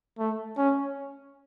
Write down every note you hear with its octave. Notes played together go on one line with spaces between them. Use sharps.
A3
C#4